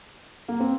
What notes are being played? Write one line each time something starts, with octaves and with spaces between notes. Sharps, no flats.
A#3
C4